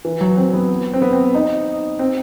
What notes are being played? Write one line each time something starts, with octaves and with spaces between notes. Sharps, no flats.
E3
F#3
C4
B3
C4
B3
C4
D#4
C4